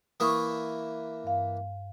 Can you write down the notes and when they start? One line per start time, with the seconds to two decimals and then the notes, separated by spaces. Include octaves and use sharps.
0.20 E3 A#3 E4 C#6 D#6
1.24 G2 F5